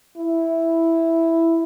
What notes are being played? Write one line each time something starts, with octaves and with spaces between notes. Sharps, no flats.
E4